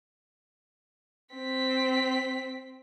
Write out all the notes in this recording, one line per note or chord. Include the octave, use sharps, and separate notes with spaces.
C4 B6